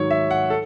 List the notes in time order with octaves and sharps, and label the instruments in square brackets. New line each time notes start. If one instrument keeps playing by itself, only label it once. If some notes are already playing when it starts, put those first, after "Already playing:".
Already playing: [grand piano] G#2 D#3 F#3 C#5
E5
F#5
A4